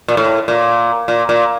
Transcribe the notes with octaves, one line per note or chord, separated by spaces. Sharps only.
A#2
A2
A#2
A#2
A#2